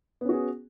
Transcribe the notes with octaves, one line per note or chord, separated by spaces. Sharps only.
B3 C#4 F#4 G#4